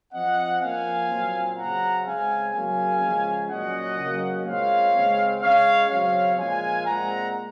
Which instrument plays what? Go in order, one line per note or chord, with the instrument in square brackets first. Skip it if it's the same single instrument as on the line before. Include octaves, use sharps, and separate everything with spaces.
[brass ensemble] F3 C4 D#5 F#5
F3 A#3 C#4 F5 G#5
A#2 F#3 C4
C#3 F#3 C4 F#5 A#5
C#3 G#3 C4 F5 G#5
C#3 F#3 A#3 C#4 F5 G#5
C#3 F3 G#3 C#4
A#2 F#3 C#4 D#5 F#5
C#3 F#3 A#3 C#4
A#2 G#3 C4 C#5 F5
C#3 G#3 C4
C#3 G#3 C#4 C#5 F5
C#3 F#3 C4 C#5 F5
A#2 F3 G#3 F5 G#5
A#2 G#3 C4 F#5 A#5